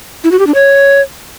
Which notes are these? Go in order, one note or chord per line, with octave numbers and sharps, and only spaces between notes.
E4
F#4
G4
D4
C#5